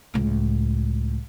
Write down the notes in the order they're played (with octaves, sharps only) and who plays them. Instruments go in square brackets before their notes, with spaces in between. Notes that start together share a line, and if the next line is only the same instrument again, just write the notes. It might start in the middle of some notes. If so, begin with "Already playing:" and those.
[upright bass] C#2 A2